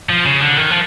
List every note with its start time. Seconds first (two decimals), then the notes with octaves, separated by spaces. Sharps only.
0.09 F3
0.25 C#3
0.41 D3
0.57 D#3
0.71 F3